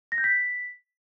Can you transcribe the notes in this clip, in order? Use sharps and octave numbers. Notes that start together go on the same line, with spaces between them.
A#6
G6
B6